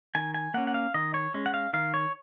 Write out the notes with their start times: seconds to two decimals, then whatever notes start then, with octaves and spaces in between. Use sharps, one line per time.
0.15 D#3 G#5
0.34 G#5
0.54 A#3 C#4 F#5
0.67 F#5
0.74 F5
0.94 D#3 D#5
1.14 C#5
1.34 G#3 C#4
1.46 F#5
1.54 F5
1.73 D#3 F5
1.94 C#5